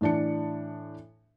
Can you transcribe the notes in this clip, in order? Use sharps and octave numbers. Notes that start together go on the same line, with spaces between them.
A2 E3 D4 A5 C#7